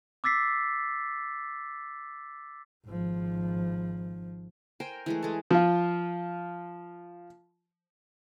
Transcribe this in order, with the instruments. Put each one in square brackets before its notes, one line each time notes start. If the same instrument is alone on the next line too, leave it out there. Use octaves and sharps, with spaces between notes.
[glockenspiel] D6 E6 A6 B6 C7
[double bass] G#1 F3
[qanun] A#4 C5 G5 G#5
E3 G#3 A3
G#3 A4
[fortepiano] F3 F4